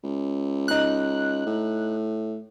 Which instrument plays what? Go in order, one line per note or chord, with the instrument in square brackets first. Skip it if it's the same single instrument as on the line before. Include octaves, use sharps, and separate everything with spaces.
[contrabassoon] C#2
[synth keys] D#4 F#6
[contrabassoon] A2